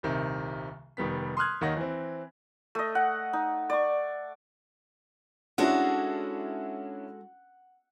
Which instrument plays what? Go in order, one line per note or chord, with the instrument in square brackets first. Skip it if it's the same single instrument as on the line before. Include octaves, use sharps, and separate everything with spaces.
[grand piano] D#1 C2 C3 D#3
F1 D#3 G3 B3 B6
C6 D#6 F6 F#6 G#6
D#2 D#3 C#5 D#5 F#5 A#6
E3 C4
[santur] A3 D#5
F#5
D#4
D5 C#6
[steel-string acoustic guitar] G#3 F#4 A4 [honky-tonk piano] C#4 D4 E4 [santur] F#5